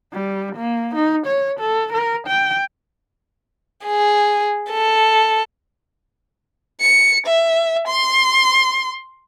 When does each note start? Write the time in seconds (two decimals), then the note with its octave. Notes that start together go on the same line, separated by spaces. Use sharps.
0.13 G3
0.56 A#3
0.95 D#4
1.27 C#5
1.60 A4
1.93 A#4
2.27 G5
3.85 G#4
4.70 A4
6.80 C#7
7.27 E5
7.88 C6